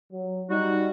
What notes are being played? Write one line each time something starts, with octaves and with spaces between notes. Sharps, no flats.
F#3
G3 D#4 F#4